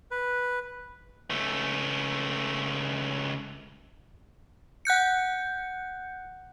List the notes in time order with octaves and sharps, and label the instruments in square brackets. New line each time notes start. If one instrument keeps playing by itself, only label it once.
[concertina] B4
[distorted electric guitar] C#2 A3
[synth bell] F#5 F#6 G6 C#7